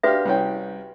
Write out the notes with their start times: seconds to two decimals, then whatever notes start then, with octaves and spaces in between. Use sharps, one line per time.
0.03 D4 F#4 G4 B4 E5 F5
0.25 C2 C#4 G5